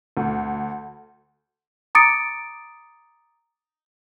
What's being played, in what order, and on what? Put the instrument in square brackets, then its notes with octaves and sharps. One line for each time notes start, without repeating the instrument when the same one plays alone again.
[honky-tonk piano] D2
[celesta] A#5 D6 D#6 A6 C#7 D7